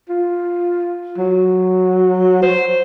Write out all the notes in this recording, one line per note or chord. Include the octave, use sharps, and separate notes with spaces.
F4
F#3
C5